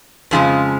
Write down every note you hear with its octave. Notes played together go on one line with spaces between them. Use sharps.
F2 C#3 F3 G#3